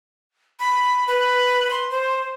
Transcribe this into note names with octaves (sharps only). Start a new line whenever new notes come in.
B5
B4
C6
C5